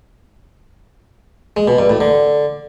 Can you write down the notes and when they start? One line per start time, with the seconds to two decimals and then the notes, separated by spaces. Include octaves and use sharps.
1.57 G#3
1.68 B2
1.79 G2
1.89 A2
2.00 D3